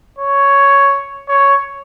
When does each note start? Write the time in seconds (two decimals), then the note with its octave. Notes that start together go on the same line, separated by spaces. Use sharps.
0.19 C#5
1.28 C#5